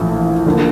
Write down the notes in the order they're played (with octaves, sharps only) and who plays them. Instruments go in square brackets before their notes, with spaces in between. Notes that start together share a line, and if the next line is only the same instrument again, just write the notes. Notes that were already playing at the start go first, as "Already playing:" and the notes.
Already playing: [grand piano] A#1 A2 E3
D3 F3 A#3